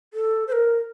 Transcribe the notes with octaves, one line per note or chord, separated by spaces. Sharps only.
A4
C5
A#4